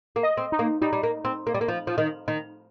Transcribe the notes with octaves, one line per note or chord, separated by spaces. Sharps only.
A#3
D#5
C4
D#4
A#3
G3 D#4
G3
A#3
C4
A#3
G3
A#3
F3
F3
D#3
D#3